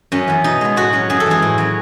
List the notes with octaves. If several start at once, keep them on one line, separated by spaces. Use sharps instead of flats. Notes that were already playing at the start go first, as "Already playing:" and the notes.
F#2 C#4
E3 B3
B2 D#4
G#3 B3
A2 F#4
F#3 C#4
F#2 G#4
A4
E3 G#3 G#4
A2
F#3 C#4